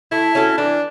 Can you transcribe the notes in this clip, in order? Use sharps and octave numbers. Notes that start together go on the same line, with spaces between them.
A3 E4
C#4 F#4 A4
E3 D4